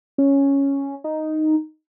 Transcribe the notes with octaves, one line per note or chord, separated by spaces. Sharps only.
C#4
D#4